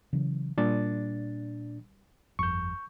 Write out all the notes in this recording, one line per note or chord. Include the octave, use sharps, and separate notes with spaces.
C#3 E3 F#3
A#2 G3 D4 A6
G1 F2 C#6 G6